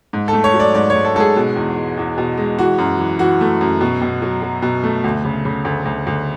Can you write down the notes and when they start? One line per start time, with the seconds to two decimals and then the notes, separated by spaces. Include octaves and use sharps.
0.13 G#2
0.28 A4
0.33 A3
0.44 C#5
0.54 F#3
0.60 D5
0.74 G#2 D5
0.90 C#5
0.95 G#2
1.05 A4
1.15 G#2 A4
1.20 G#4
1.36 B2
1.56 E2
1.76 G#3
1.98 E2
2.18 B2
2.37 G#3
2.59 E3 F#4
2.78 F#2
2.99 E3
3.19 E3 F#4
3.41 A3
3.61 F#2
3.81 B2
4.01 B2
4.22 F#3
4.42 F#3
4.62 B2
4.83 A3
5.04 D2
5.25 C#3
5.45 C#3
5.65 D2
5.85 D2
6.07 D2